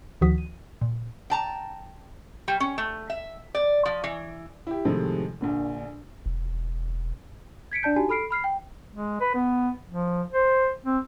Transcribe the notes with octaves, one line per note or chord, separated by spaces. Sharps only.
D2 D#3 F3 F#4 D#6 B6
D#7
A#2
G5 A5 A#5
G3
C#4
A3
E5
D5
F3
E3
E4 G4
A2 C3 D#3 F3 G#3 A3
A#1 A#2 D3
E1
G#6 B6 C#7 D7
D4 D5 A5 G6
D#4 F#4 G4 G#5 A5
A4 B5 F6 C7 D7
B5 F6 C7
G5
G#3
B4
B3
F3
C5
C4